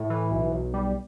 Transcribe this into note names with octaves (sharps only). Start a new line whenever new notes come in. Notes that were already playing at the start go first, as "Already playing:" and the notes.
Already playing: A2
E3
B1
B1
G3